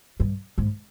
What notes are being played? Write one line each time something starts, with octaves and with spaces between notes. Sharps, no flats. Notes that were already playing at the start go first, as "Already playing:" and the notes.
G2
G#2